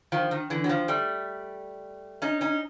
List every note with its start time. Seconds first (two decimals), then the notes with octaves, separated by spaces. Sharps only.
0.12 D#3 F3
0.31 D#3
0.50 D3 E3
0.64 F#3
0.69 D#3 F3
0.88 G3 A3
2.22 C#4 D#4
2.41 C#4 D#4